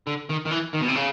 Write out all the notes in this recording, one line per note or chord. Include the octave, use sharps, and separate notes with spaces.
D3
D#3
D#3
E3
D#3
B2
C3
C#3